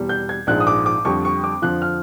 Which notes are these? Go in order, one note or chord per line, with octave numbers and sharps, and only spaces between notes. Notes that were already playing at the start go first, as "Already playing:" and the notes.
Already playing: E2 B2 G3
G6
G#6
A#1 G#2 F3 G#3 F#6
D#6
D6
D6
F2 D3 G3 C#6
C#6
D6
F2 D3 F3 F#6
F6